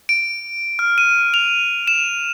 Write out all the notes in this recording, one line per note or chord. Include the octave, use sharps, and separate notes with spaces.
D7
F6
D#7
F7
E7